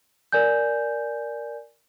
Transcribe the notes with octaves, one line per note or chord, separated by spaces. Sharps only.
A#4 D5 G#5 G6